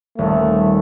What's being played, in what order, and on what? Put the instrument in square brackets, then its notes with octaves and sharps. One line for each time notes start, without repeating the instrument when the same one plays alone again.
[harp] D#1 [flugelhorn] A3